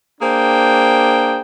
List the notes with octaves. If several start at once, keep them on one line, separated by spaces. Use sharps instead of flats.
A#3 D4 G#4 C5 G5